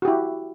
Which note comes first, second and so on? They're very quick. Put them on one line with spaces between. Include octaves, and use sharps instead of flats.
F#4 G4 E4